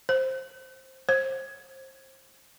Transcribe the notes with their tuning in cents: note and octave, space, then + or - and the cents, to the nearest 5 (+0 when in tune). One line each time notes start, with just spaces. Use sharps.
C5 +10
C5 +30